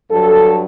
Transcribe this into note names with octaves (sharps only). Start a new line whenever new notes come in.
G2 F#3 A4